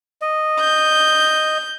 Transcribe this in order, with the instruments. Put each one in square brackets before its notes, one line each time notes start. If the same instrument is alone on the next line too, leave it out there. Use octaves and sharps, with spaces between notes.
[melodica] D#5
[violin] G6